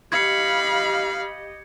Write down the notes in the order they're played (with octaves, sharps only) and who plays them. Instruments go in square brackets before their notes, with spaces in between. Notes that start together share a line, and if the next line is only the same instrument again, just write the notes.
[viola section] G4 D#5 [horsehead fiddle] F5 [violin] B5 [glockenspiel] G#6 C#7